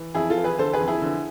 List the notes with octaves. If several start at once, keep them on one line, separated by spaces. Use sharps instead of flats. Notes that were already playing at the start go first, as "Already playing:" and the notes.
Already playing: E3
F2 E4 G#4
F4 A4
E3
G#4 B4
D3 A4 C5
G#4 B4
F2
E4 G#4
D3